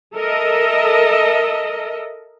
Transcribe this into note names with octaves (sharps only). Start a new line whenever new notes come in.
A4 A#4 D#5 E5